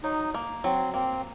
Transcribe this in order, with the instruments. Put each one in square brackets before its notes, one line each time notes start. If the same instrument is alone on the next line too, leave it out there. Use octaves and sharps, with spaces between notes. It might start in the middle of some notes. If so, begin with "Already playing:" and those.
[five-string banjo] F#3 [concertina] D#4
[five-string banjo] A#3
[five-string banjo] F#3 [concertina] C4
[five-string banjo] A#3 [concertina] C4